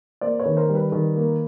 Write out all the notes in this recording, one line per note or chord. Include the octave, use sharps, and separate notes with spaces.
A#3 C5 D5
B4 C#5
D#3
A#4 C5
G3
B4
D#3
A#3